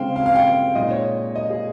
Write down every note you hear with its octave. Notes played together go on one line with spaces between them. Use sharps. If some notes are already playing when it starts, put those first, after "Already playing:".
Already playing: C#3 G#3 C4 C5 F5 G5
F5
F5
G5
A#2 G#3 D#4 D#5
C#5
D#5
G#4